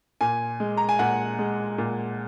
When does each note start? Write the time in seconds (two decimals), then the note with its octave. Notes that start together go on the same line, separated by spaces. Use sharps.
0.21 A#2 G#5
0.60 G#3
0.77 A#5
0.89 G#5
0.99 A#2 F#5
1.39 G#3
1.78 A#2